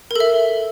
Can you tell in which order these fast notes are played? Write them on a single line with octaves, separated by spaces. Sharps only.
A#4 A4 E5